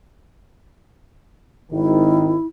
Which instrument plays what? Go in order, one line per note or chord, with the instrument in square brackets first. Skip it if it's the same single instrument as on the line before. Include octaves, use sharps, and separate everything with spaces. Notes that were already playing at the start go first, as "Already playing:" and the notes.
[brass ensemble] G#1 D#3 [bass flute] E4